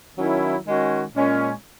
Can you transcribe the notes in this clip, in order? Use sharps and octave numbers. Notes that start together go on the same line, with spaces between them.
D#3 F#3 C#4 E4
D#3 G#3 C#4 F#4
A#2 G#3 C#4